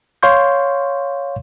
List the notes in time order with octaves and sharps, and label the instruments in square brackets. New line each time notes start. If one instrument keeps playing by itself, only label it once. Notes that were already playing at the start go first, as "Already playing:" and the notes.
[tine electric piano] C#5 F5 C6 C#6 G6